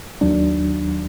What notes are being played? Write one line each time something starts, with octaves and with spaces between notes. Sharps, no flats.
D#2 D#3 F#3 D4